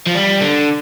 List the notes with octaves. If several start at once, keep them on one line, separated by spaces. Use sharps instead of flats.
F3
G3
D3